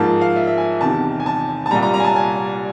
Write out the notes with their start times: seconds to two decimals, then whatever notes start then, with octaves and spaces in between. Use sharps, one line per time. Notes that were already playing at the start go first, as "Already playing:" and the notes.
Already playing: G#2 F3 A#3 A5
0.21 F5
0.36 E5
0.47 E5
0.58 G#5
0.81 E2 C3 D#3 A5
1.20 G#5
1.26 A5
1.66 A5
1.71 C2 A#2 G3 A#5
1.82 A#5
1.94 A#5
2.00 G#5
2.04 A5
2.16 G#5